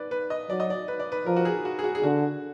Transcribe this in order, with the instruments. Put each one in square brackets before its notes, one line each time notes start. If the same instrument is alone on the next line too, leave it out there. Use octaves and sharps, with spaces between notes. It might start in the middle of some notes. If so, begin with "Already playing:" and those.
Already playing: [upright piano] B4 D5
B4
D#5
[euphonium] F#3 [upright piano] D5
[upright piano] D#5
D5
B4
D5
B4
[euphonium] F3 [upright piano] A#4
[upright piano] F#4
G#4
F#4
G#4
F#4
G#4
[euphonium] D3 [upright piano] F#4